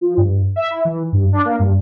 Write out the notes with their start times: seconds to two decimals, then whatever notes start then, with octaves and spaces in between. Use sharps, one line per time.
0.01 F3
0.17 G2
0.56 E5
0.70 E4
0.85 E3
1.12 G2
1.33 D4
1.45 A#3
1.59 G2